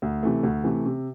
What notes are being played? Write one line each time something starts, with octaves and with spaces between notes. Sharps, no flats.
D2
C3 E3 A3
D2
C3 E3 A3
C3